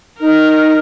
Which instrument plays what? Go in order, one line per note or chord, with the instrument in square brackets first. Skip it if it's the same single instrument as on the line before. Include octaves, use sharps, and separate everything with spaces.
[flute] D#4 [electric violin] A#4